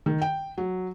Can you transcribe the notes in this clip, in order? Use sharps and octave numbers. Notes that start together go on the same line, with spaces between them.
D#3
G5
F#3